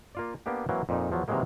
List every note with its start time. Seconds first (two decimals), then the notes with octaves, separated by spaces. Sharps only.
0.15 A#3 F4 D5
0.46 A#3 B3 D4 G4
0.69 E3 F#3 A#3 C4
0.89 F2 A#2 D#4
1.10 E2 F3 F#3
1.28 C3 D#3 E3 F#3 G#3 A#3